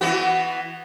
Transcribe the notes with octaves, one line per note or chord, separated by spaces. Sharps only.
E3 B3 F#4